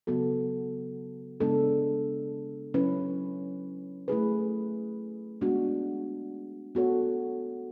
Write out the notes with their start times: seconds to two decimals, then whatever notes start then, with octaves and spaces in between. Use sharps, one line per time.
0.07 C#3 F#3 B3 F#4 A4
1.40 C#3 G#3 B3 D4 A4
2.74 F#3 C#4 E4 B4
4.08 A3 E4 G#4 B4
5.41 G#3 B3 D4 F#4
6.75 B3 F#4 A4 C#5